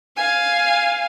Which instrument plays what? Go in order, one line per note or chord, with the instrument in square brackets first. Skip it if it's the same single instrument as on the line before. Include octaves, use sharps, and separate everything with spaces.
[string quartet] F5 G#5